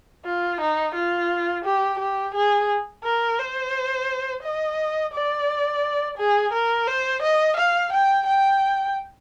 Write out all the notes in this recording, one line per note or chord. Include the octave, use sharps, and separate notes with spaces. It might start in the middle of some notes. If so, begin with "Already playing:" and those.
F4
D#4
F4
G4
G4
G#4
A#4
C5
D#5
D5
G#4
A#4
C5
D#5
F5
G5
G5